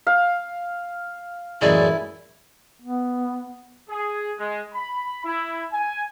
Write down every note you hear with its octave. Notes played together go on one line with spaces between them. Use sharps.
F5
A1 F#2 G#3 E4 D5
B3
G#4
G#3
B5
E4
G#5